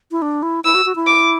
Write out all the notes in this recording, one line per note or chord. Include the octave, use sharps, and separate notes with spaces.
E4
D4
E4
E4 E6
F#4
F#4
E4
D6